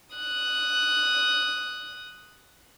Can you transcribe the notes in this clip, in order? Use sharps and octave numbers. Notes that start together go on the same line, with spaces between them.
D#6 F#6